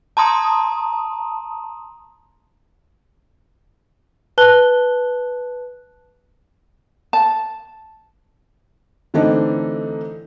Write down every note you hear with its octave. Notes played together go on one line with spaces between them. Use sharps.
A5 A#5 C6 D#6
B4 A5 F#6 G7
A5
D3 E3 A3 C4 D4 D#4